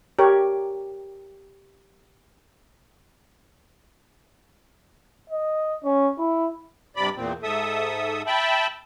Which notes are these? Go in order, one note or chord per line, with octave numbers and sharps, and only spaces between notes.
G4 A#4 C#5
D#5
C#4
E4
G2 C3 D5 B5
E2 A#2 C4
G#2 A4 E5 D#6
E5 G5 A5 B5